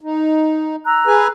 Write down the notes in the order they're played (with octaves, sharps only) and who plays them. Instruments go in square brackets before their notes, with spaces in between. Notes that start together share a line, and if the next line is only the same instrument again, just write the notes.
[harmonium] D#4
[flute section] A#5 E6 F#6
[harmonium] G#4 B4 G#5